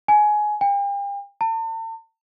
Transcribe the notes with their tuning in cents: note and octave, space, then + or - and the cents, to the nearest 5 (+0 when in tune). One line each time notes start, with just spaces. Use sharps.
G#5 +20
G5 +40
A5 +40